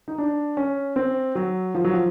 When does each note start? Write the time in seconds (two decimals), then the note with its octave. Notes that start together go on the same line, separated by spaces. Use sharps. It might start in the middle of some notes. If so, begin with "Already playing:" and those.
0.08 D#4
0.18 D4
0.57 C#4
0.96 C4
1.35 F#3
1.75 F3
1.84 F#3
1.93 F3